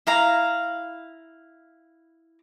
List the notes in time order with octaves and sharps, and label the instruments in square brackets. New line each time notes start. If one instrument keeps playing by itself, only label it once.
[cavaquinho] E4 F5 A#5